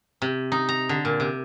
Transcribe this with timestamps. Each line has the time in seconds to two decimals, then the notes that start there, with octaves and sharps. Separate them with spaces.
0.22 C3
0.52 D#4
0.69 A#5
0.89 D3
1.05 A#2
1.20 C3